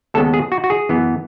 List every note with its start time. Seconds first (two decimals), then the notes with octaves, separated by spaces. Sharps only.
0.14 D#2 C#3 G#3 B3 A4
0.34 G#4
0.52 F#4
0.64 F#4
0.70 G#4
0.89 F#2 E3 B3